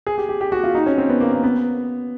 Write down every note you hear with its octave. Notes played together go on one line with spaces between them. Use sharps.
G#4
G4
G4
G4
F#4
F4
D#4
C#4
C4
B3
A#3
A#3
B3